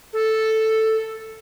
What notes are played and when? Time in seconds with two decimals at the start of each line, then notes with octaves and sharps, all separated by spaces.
0.13 A4